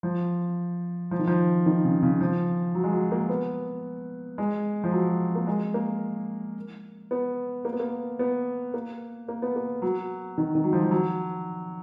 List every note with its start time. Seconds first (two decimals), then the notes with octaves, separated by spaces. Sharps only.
0.03 F3
1.11 F3
1.19 D#3
1.27 F3
1.66 D#3
1.85 C#3
2.03 C#3
2.21 F3
2.75 F#3
2.84 G#3
2.93 F#3
3.12 A#3
3.29 B3
4.38 G#3
4.84 F3
4.92 F#3
5.35 A#3
5.47 G#3
5.74 A#3
7.11 B3
7.65 A#3
7.73 B3
7.80 A#3
8.19 B3
8.74 A#3
9.28 A#3
9.42 B3
9.56 A#3
9.82 F#3
10.38 D#3
10.55 D#3
10.64 F#3
10.73 F3
10.83 F3
10.91 F#3